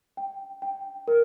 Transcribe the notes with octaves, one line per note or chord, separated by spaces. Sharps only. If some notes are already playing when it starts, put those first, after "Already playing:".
G5
G5
A#4